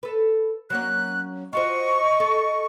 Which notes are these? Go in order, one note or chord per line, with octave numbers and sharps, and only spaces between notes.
A4 B4
F#3 A#3 C#4 F#6
F4 F#4 C5 D#5 C#6
A4